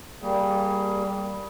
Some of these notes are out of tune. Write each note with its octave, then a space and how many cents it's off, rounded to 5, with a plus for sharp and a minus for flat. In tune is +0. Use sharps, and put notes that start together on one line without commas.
G3 +0 A#3 -5 G#4 +20